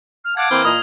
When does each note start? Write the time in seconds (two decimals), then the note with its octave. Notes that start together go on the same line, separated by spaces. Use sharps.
0.24 F6
0.37 F5 F#5 A5 D6 G#6
0.51 E3 A#3 C4 B5 F6
0.65 A#2 D#5 D#6